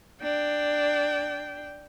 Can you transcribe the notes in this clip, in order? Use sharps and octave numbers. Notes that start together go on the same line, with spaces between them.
D4 G5